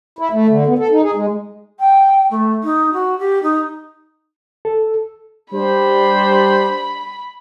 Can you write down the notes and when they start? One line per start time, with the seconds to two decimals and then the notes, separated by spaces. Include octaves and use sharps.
0.19 E4
0.33 A3
0.49 D3
0.66 B3
0.79 A4
0.91 D#4
1.03 G#4
1.15 G#3
1.79 G5
2.30 A3
2.63 D#4
2.92 F#4
3.18 G4
3.42 D#4
4.65 A4
5.53 G3 D4 C5 B5